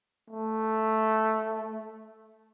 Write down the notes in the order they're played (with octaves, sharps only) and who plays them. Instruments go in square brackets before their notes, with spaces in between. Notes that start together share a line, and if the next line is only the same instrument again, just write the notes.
[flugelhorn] A3